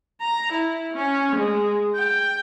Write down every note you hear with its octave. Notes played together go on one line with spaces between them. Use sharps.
A#5
E4
C#4
G#3
G5